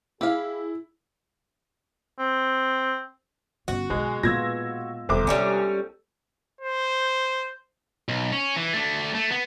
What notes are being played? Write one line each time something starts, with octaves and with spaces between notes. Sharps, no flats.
E4 G4 G#4 F5
C4
G1 C#4 F#4
B1 G#3 G#4
A#2 G#3 B3 F4 E6 G#6 A#6
E1 C2 D3 A4 C5 D6
G3 G#3 C#4 D4
C5
B1
C#4
E3
A3 D4
A3
B3